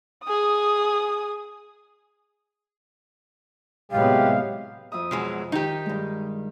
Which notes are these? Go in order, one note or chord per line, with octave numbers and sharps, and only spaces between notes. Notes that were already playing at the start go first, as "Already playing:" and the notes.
G#4 D#6
A2 C3 F#3 G#3 B3 G4 F5
F2 E5 D#6
B2 F#3 G#3
D#3 D#4 G4
G2 G#3